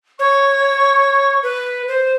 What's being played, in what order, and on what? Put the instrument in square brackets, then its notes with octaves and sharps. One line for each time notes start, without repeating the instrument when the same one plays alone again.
[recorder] C#5 [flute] C#6
[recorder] B4
C5